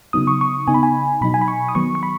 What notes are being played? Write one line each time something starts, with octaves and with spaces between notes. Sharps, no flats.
C#3 F#3 B3 D#4 D#6
C#6
C#6
C#3 B3 D#4 G#5
B5
G#5
B2 F#3 D#4 B5
G#5
B5
C#6
D#6
D#3 F#3 B3 C#6
C#6
B5